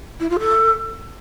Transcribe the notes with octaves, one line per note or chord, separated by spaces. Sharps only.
E4
F4
A4